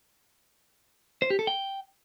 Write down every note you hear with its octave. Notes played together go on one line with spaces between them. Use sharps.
C5
G4
A4
G5